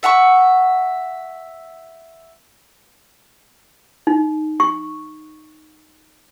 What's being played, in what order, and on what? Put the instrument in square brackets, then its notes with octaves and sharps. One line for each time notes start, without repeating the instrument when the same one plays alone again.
[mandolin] E5 F#5 A5 C#6
[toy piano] D#4
C#6